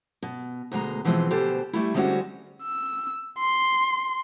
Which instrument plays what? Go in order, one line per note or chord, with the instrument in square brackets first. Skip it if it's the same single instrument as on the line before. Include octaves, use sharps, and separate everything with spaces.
[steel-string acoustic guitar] B2
D2 B2 G#3 A#5
B2 E3 F3 G#3 C4
D2 B2 G4 A4 C5 G#5
G3 A3 E4
D3 G3 G#3 C4 C#4 F#4
[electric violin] E6
C6